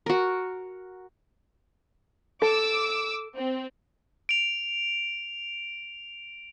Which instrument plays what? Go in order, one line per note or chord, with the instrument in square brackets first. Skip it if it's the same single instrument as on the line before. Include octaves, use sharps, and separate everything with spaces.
[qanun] F#4 A#4
[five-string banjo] A4 [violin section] D6 E6
[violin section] C4
[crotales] D7 F7